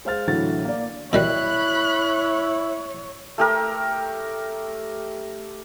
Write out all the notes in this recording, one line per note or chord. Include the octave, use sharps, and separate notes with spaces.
G#3 C5 F5 F6 A6
A2 D3 E3 F#3 F#4 A6
A#3 D5
B2 D#3 G3 E4 C#5 B5 F#6
A3 G4 A#4